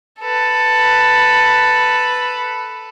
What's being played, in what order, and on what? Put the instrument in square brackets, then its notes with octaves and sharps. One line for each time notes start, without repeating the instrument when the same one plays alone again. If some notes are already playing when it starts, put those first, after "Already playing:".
[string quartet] A4 B4